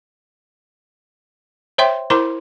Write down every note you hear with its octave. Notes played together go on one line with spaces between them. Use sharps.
C5 C#5 E5 G5 C6
E4 A#4 C5 A#5 C6 D6